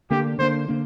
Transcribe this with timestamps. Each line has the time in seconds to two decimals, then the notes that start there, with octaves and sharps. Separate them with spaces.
0.10 D3 A#3 D4 G4
0.38 D3 A#3 D4 C5
0.68 D3 A#3 D4